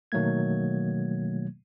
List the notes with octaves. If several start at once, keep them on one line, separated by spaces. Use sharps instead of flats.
B2 D#3 F#3 A3 A#3 G#6